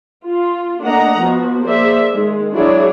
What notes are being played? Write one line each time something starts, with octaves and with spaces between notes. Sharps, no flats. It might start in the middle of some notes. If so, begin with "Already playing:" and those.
F4
A3 A#3 D4 D#5 F#5 A#5
F3 B3 F#4
A#3 G#4 C5 D5 E5
D#3 G#3
F#3 D4 E4 G#4 C#5 D5